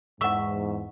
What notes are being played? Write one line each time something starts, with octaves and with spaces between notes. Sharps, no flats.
E2 G#2 E5 F#5 C#6